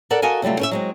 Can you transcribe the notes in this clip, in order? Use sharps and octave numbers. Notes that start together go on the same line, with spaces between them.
A4 A#4 D5 F#5
F#4 A4 A#4 D#5 F5 G#5
C3 F#3 G3 A3 F4
C#4 A#4 E5
F#3 G#3 C4